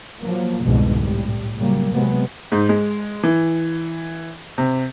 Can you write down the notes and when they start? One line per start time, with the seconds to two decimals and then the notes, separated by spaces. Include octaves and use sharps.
0.20 F3 F#3 A#3
0.64 C2 F2 G#2 B2 D3 G#3
1.01 A2 G3
1.59 C#3 F#3 G3 A#3
1.93 C3 F#3 G#3 B3
2.52 G#2
2.69 G#3
3.23 E3
4.58 C3